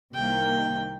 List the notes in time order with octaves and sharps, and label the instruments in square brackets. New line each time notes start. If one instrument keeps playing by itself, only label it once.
[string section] C2 C3 D#3 A#3 [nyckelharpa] G5